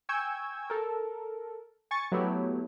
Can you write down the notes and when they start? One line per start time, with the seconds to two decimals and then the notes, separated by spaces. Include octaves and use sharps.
0.09 G5 G#5 C#6 E6 G6 G#6
0.70 A4 A#4
1.91 G#5 C#6 A6
2.12 F#3 A3 B3 E4 G4